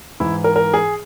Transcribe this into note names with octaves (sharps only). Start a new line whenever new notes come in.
G#2 E3 E4
A#4
A#4
G#4